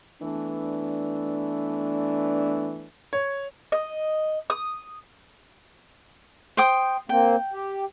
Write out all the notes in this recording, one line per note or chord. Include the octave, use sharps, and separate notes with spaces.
E3 A3 B3 D4
C#5
D#5
D#6
C5 G5 D#6
A#3 C4 G5
G4